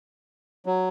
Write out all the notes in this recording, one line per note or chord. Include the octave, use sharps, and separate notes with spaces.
F#3